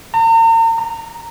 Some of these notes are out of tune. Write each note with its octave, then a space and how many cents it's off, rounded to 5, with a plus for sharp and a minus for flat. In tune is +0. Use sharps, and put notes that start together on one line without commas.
A#5 -40
A#5 -5